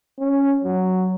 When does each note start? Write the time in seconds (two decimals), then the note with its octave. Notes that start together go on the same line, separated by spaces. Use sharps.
0.18 C#4
0.64 F#3